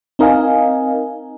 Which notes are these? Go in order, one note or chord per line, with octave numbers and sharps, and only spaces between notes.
C4 D#4 A#4 D#5 F5 G#5